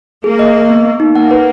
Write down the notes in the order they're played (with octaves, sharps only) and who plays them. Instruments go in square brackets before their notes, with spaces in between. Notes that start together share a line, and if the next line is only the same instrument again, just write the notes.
[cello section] A#3 [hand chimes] G#4
[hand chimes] D#5
D#5
B3
B3
D#4
[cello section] A#3 [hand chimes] F#5
[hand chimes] B4